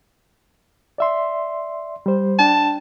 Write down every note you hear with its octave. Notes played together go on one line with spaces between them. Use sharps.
D5 E5 C6
G3 C5
D4 G5 A5